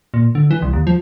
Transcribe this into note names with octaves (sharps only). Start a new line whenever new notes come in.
A#2
D3
E3
C2
D#2
F3